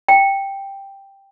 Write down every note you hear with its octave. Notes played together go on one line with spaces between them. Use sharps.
G5